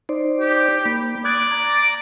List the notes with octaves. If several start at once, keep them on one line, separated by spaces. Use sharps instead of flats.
D#4 C5 D5
G4
A#3 B5
D5 D#6 F#6 G#6
A#5 D6